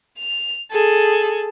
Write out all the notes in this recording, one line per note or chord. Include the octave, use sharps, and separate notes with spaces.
F7
G#4 A4